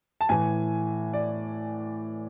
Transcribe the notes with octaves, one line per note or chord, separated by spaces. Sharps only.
A5
A2 E3 G#5
D5